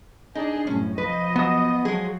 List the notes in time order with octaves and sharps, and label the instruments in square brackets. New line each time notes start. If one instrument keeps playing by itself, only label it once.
[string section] D4 G#4 [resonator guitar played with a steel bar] D#4
[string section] C2 F#2 A2 [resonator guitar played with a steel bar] C#4
[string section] F3 D#5 [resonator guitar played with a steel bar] B4
[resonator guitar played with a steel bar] F#3 [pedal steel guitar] B3 D#6
[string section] F3 F#3 [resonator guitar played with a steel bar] G#3 G#4